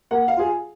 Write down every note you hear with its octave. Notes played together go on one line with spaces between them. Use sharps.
A#3 F#5
F5
F4 G#4